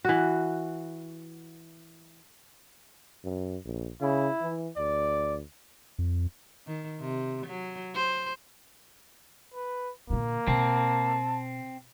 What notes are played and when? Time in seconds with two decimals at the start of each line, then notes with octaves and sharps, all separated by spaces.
0.05 E3 F#4
3.24 F#2
3.65 A#1
4.01 C#3 E4
4.42 E3
4.77 D2 D5
5.99 F2
6.67 D#3
7.00 C3
7.46 F#3
7.95 C5
9.54 B4
10.10 A#2 D3 A#3
10.48 B2 C4 A5